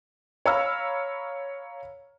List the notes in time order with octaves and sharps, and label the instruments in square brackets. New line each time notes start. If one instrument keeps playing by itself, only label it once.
[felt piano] C#5 F5 A#5 B5 E6 F6